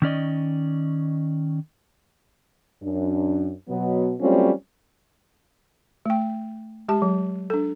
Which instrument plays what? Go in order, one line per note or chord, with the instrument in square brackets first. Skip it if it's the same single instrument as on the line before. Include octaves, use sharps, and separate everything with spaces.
[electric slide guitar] D#3 C#4 D5 D#5
[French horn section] F#2 D4
B2 F#3 B3
F#3 G3 A3 C4 C#4 F4
[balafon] A3 G5
G#3 G4 A5
F#3
D4 A4